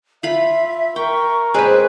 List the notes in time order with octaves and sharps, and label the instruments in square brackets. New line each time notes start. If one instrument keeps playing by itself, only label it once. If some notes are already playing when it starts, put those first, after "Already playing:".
[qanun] F4 B5 [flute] E5
[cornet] A#4 [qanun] G5 [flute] C#6
[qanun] G#3 C#4 G#4 [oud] C4 B4 [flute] F#6